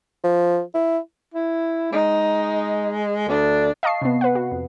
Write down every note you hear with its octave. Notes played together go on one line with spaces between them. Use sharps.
F3
E4
E4
G#3 D#4
D2 D4
D#5 F5 A5 C#6 C7
C3 B3
B4 F#5
F#4
F2